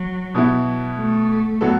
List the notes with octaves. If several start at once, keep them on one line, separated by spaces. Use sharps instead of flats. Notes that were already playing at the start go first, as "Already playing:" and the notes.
Already playing: F#3
B2 B3 E4
A3
A2 F#3 B3 F#4 A4